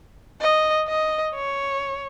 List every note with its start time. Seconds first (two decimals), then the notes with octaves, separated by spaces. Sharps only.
0.41 D#5
0.88 D#5
1.35 C#5